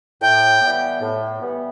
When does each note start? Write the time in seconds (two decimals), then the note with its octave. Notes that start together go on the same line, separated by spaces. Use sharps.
0.22 A2 G5
0.61 E3 G3 B3
1.01 A2
1.41 E3 G3 B3